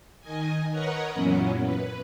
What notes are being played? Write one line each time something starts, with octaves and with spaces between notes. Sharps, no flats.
D#3 D#5 G#5
A#4 B4 C#5 D#5 F#5 A#5
F#2 A#2 E3 F#3 B3 C#4
B4